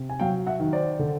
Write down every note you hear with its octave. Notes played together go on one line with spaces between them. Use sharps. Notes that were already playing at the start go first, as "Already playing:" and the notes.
Already playing: C3
G#5
F#3 F5 G5
E5 F#5
D#3
C5 D5
D3